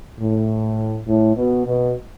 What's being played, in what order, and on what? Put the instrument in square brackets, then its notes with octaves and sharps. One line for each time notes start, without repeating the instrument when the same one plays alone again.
[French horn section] A2
A2
B2
B2